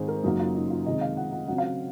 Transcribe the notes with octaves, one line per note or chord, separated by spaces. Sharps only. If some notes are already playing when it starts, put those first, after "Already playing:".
Already playing: G#2 D#3 G#3 C4 C5
A#4
F#2 C#3 F#3 A#3 D#4
F4
D#4
F4
C3 D#3 G#3 D#5
F5
F#5
F#5
C#3 F#3 C4 F#5
F5